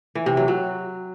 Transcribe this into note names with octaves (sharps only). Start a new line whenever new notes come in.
E3
C3
F#3
F#3